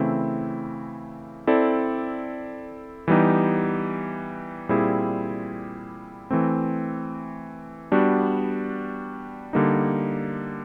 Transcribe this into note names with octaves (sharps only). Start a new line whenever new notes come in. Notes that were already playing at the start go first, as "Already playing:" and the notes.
Already playing: C#3 E3 A3 C4 E4
C4 E4 A4 D5
E3 G3 B3 D#4 G4
A#2 G3 C4 E4 G#4
E3 A3 C4
G3 B3 D4 F#4
D3 G3 A#3 D#4